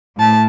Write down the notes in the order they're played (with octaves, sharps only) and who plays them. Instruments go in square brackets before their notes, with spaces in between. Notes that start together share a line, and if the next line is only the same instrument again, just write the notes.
[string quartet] A2 A5